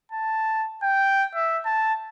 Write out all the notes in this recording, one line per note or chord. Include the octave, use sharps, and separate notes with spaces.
A5
G5
E5
A5